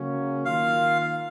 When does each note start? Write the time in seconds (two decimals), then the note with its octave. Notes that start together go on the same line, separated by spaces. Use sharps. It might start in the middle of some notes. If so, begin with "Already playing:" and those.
Already playing: C#3 F#3 A#3 C#4
0.45 D#3 A#3 F4 F5